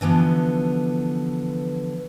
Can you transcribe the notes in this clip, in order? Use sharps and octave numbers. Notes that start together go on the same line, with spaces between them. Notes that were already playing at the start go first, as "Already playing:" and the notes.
D3 E3 F3 B3